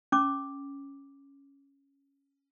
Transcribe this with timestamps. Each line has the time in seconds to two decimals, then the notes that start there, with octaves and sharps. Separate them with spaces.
0.12 C#4 D6